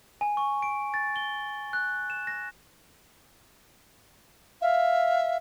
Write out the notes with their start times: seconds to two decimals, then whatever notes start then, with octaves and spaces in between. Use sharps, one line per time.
0.21 G#5
0.37 C#6
0.62 D7
0.94 A6
1.16 G7
1.73 F#6
2.10 E7
2.27 A#6
4.62 E5 F5